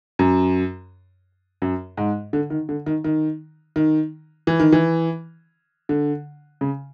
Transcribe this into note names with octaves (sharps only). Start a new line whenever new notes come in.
F#2
F#2
G#2
D3
D#3
D3
D#3
D#3
D#3
E3
D#3
E3
D3
C#3